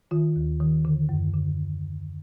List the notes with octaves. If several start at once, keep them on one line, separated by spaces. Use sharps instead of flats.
D#3 F4
D#2
D#3
D3
F#2
D3